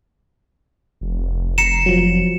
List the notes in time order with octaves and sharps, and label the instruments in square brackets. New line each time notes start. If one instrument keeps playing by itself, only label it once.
[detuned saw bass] F1
[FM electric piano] A#5 C7 [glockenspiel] C#7 E7
[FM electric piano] F3 F#3